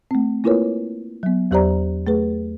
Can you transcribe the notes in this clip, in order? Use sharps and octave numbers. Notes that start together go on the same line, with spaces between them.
A3 C4
A#3 E4 F4 A#4 B4 C#5
F#3 B3
E2 F#3 G4 C5 D5 A#5
A3 G#4 B4